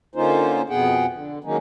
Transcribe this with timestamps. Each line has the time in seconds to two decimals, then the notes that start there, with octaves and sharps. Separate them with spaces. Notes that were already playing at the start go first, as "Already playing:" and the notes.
0.15 D3 A#3 C#4 D#4 F4 C5
0.70 F2 B2 B3 G#4 F#5 G5
1.12 D3
1.44 D#3 F#3 G#3 A#3 C#4 D#4